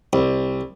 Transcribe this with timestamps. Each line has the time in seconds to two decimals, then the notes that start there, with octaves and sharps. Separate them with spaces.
0.13 C2